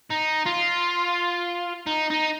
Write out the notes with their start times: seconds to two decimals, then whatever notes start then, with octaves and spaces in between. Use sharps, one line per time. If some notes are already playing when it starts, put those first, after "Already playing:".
0.11 D#4
0.46 F4
1.87 D#4
2.11 D#4